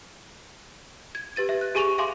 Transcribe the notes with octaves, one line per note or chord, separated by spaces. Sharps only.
G#6
G4 B4 A6 D#7
E5
F#6
G4 G#4 G#5 C#6 D#7 F7
E5 F5 G#5 C6 D6